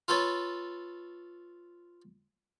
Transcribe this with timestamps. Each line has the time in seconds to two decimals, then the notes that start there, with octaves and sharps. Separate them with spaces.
0.08 F4 A4 B4 C#5